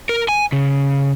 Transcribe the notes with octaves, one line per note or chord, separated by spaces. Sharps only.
A#4
G#5
C#3